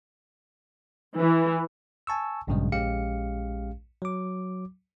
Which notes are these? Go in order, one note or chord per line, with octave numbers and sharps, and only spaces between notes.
E3
G#5 A5 C#6 E6
A1 G2 A#2 C#3 F#3 G#3
A#1 G#3 C#4 G4 F5 C#7
F#3 D6